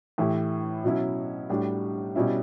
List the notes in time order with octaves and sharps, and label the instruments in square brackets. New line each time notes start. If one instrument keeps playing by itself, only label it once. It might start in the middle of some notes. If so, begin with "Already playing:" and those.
[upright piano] A2 E3 A3 E4 G4
B2 F#3 C#4 E4
A2 G3 D4 F#4
B2 G3 C#4 E4